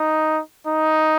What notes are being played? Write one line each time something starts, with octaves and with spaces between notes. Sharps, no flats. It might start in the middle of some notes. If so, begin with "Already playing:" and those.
Already playing: D#4
D#4